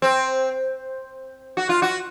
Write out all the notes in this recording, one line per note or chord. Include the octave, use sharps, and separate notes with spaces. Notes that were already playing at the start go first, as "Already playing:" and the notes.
C4
F#4
F4
F#4